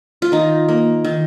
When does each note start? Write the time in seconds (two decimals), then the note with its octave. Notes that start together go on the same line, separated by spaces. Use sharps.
0.22 F4
0.32 D#3 D#4
0.68 A#3
1.04 D#3